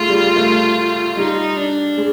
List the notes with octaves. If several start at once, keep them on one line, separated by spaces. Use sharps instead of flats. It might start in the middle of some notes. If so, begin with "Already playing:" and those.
Already playing: G#3 A3 F4
G3
A3
G3 D#4
D4
G#3